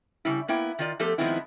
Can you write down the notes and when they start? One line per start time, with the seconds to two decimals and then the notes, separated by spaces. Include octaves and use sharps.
0.25 C#3 G3 E4
0.48 A#3 B3 E4 G5
0.79 D#3 F4 D5
0.99 F3 A3 B3 G4 A4
1.18 D#3 F3 G#3 B3 C4 E4